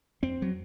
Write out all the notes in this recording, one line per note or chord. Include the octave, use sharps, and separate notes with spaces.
F2 C4
F#3